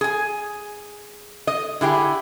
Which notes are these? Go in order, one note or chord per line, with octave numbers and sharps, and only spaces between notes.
G#4 G#5
D#5
D3 E4 G4 G#4